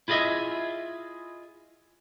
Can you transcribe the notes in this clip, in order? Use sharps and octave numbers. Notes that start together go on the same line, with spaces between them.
E4 F4 G#4 D#5 E5